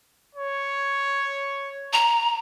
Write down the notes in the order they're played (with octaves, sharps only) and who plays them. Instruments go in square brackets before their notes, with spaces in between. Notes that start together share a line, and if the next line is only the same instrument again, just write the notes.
[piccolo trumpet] C#5
[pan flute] A#5